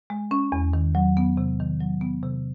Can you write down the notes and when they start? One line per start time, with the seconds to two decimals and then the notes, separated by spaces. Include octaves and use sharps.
0.10 G#3
0.31 C#4
0.52 E2
0.73 D#3
0.95 F#3
1.17 B3
1.37 C3
1.60 D#3
1.80 F#3
2.01 B3
2.23 C3